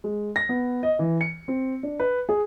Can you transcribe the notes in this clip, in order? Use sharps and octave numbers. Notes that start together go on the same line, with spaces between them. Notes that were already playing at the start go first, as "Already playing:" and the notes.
G#3
A#6
B3
D#5
E3
C#7
C4
D4
B4
G#4